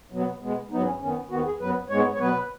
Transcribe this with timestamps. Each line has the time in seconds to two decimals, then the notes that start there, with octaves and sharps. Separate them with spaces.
0.12 B2 F#3 B3
0.41 B2 G#3 B3
0.71 G#2 F#3 B3 D#4
0.86 C#4
1.00 F#2 D#3 B3 C#4
1.30 D#2 D#3 B3 F#4
1.45 G#4
1.60 F#2 F#3 B3 B4
1.90 G#2 G#3 B3 C#5
2.14 C#5
2.19 B2 F#3 B3 B4